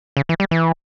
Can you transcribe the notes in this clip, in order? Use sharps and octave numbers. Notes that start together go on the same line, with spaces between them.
C#3
E3
G3
E3